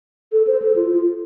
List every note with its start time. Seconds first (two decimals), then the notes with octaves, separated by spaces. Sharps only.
0.32 A4
0.47 C5
0.62 A4
0.76 F4
0.91 F4